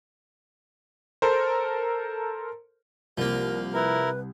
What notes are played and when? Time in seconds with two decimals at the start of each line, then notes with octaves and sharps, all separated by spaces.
1.22 A4 A#4 C5
3.18 C2 F3 A#3 A#4
3.74 E4 A#4 B4